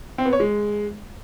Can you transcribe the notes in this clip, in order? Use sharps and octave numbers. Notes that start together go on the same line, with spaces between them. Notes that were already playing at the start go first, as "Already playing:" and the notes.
C4
B3
C#5
G#3